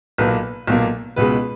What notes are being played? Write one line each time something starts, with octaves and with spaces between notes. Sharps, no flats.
B1 A#2 A#3 B4
B1 A#2 A#3
C#2 B2 G#3 B4